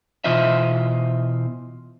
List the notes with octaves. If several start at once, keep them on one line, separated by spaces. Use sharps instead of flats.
B2 E3 F4 C5 D#5 E5